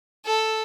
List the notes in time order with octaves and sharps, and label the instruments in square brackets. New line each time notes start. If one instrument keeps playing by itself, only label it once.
[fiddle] A4